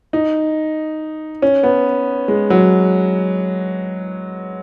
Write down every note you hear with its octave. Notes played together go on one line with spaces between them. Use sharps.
D#4
C#4
B3
G#3
F#3